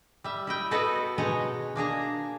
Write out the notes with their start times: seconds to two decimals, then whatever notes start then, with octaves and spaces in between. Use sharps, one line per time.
0.24 G3 E5
0.47 E4 D#5 G5
0.71 B3 F#4 A4 B4 D#5 A5
1.18 B2 G#3 D#4 C#5 D#5 F#5
1.76 A#3 D4 G#4 A#5